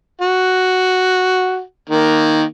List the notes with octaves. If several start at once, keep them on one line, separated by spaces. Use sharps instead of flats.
F#4
D#3 A#3